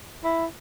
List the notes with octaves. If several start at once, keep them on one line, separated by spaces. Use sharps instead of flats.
E4